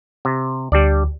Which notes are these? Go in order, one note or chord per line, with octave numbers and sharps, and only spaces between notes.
C3
D2 G3 D4 D5